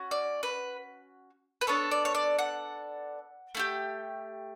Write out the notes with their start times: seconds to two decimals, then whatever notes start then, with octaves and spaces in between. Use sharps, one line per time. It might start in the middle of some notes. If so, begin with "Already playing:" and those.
Already playing: C#4 F#4
0.11 D5
0.43 B4
1.61 B4
1.67 B3 D4 A4 C#5
1.91 D5
2.05 C#5
2.15 D5
2.39 F#5
3.55 A3 E4 G4